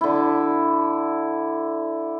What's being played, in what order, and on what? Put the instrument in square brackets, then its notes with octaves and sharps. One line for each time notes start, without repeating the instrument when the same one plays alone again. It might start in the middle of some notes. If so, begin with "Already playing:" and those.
[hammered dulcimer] D3 E4